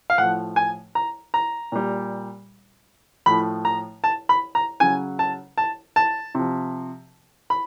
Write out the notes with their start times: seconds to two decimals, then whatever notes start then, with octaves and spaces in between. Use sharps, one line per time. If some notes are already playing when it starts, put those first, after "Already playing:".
0.10 F5
0.18 A2 F3 F#5
0.56 G#5
0.95 A#5
1.34 A#5
1.72 A#2 G3
3.26 A2 F3 B5
3.65 A#5
4.04 A5
4.29 B5
4.55 A#5
4.80 C#3 F#3 G#5
5.19 A5
5.58 A5
5.96 A5
6.35 C3 F3
7.50 B5